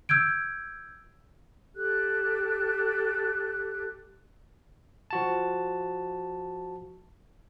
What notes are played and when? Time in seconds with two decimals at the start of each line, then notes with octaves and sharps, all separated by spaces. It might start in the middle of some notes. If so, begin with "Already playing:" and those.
0.09 E6 G6 G#6 D7
1.74 G4 A4 F#6
5.10 F3 F#4 A5